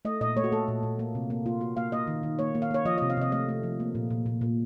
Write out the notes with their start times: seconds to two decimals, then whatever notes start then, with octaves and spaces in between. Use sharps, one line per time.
0.05 A3 D#5
0.21 A#2 D#5
0.37 A3 C#5
0.44 F#4
0.52 A3 A4
0.68 A#2
0.83 A#2
0.99 A#3
1.15 C3
1.30 A#3
1.46 A#3 F4
1.61 A#3 F#4
1.77 A#3 F5
1.92 A#3 D#5
2.07 D#3
2.23 D#3
2.39 A#3 C#5
2.55 A#3
2.62 F5
2.71 A#3 C#5
2.85 F3 D#5
2.98 D#5
3.02 C3
3.10 F5
3.17 C3 D#5
3.32 A3 D#5
3.49 A3
3.63 F3
3.80 A#3
3.95 A#2
4.11 A#2
4.26 A#2
4.41 A#2